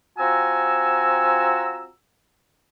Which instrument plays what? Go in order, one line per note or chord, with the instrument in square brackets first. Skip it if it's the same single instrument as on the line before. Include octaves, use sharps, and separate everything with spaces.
[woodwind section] C4 F4 F#4 G#5 A#5 E6